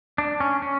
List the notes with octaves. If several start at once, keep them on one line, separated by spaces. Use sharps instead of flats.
D4
C#4
C#4